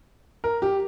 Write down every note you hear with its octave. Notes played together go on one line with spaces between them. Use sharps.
A#4
G4